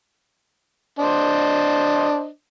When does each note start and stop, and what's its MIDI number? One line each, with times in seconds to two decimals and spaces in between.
0.99 2.27 62
0.99 2.27 72
0.99 2.27 75